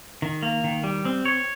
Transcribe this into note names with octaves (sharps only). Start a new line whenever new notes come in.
D#3
A#3
D#3
G3
C4
C#5